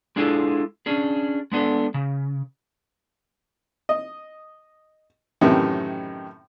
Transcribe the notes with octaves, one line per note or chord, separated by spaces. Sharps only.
G#3 D4 E4 F4 G#4 A4
C#4 D4 G#4
G#3 B3 D4 A4
C#3
D#5
F#2 A2 C3 D#3 E3